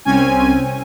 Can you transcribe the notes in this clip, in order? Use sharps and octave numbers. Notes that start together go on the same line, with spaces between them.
C2 C4 C#4 G#5